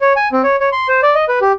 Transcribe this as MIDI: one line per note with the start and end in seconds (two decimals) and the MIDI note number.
0.01 0.13 73
0.16 0.28 80
0.32 0.42 60
0.44 0.56 73
0.60 0.69 73
0.72 0.88 84
0.89 1.00 72
1.03 1.15 74
1.15 1.25 75
1.28 1.39 71
1.41 1.52 67